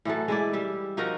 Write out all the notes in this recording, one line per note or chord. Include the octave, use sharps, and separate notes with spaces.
A2 E3 F#3 A4
G#3 E4 D5
G3 G4 E5
F3 D#4 F#4 A#4